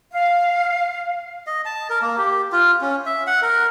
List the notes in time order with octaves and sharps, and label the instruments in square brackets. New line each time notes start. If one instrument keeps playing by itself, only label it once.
[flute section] F5
[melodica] D#5
A5
A#4
A#3
G4
F4
C#4
E5
F#5
A#4